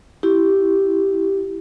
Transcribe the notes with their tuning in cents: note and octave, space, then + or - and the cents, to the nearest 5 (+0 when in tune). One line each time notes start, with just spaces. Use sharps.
E4 +0 G4 -5